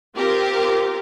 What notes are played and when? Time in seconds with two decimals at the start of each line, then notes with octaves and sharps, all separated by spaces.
0.17 C4 F4 G4 A#4